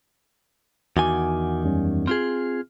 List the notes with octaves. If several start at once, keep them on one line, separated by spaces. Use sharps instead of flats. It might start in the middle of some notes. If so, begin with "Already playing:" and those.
E2 D#3 F#4 G#5 D6
F#2 G3 C#4
C4 F4 G#4 F6